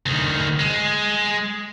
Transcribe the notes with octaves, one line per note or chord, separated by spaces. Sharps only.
D2 D#3
G#3